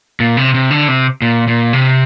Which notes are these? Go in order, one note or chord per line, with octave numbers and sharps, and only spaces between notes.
A#2
C3
C3
D3
C3
A#2
A#2
C3